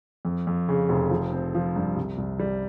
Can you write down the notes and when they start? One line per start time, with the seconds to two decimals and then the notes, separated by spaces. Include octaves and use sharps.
0.25 F2
0.47 F2
0.69 C#3
0.89 F1
1.11 F3
1.32 C4
1.55 F3
1.76 G2
1.97 C2
2.18 C2
2.39 G3